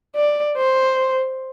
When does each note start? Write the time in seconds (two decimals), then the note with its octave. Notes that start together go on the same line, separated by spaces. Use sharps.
0.16 D5
0.57 C5